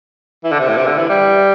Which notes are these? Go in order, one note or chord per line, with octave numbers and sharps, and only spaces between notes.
E3
D3
C3
A2
C3
D3
E3
G3